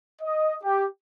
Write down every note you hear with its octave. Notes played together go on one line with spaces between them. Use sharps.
D#5
G4